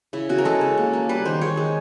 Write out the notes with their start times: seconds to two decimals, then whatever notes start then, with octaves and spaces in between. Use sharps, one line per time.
0.13 C#3 E4
0.29 C#3 F#4
0.38 A#4
0.45 G#3 A4
0.61 C#3
0.77 A#3
0.93 A#3
1.09 G3 B4
1.25 D#3 C5
1.41 G#3 C#5
1.57 G#3